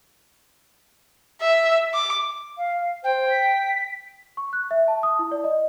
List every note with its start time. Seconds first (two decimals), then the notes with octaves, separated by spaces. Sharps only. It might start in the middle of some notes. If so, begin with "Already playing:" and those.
1.41 E5
1.94 D6
2.58 F5
3.04 C5 G5
3.30 B6
4.37 C#6
4.53 F#6
4.71 E5
4.88 A5
5.03 D#6
5.19 E4
5.31 D5
5.44 D#5